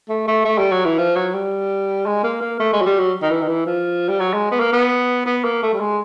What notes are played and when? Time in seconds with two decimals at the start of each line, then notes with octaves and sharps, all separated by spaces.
0.09 A3
0.28 A3
0.45 A3
0.58 G3
0.72 F#3
0.85 E3
0.98 F3
1.16 F#3
1.34 G3
2.06 G#3
2.23 A#3
2.41 A#3
2.59 A3
2.73 G#3
2.81 F#3
2.86 G3
2.99 F#3
3.22 D#3
3.30 E3
3.42 D#3
3.48 E3
3.66 F3
4.09 G3
4.20 F#3
4.33 G#3
4.51 B3
4.60 A#3
4.73 B3
5.26 B3
5.44 A#3
5.62 A3
5.73 G3
5.80 G#3